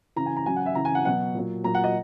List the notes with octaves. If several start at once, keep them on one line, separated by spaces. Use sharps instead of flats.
C#3 E3 A#5
G#5
A#5
C#3 F#3 G#5
F#5
E5
C#3 E3 A#5
G#5
F#5
B2 F#3 F#5
A#2 F#3
A#2 F#3 A#5
F#5
D#5